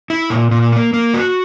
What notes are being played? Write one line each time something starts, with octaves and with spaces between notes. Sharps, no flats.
E4
A#2
A#2
A#3
A#3
F#4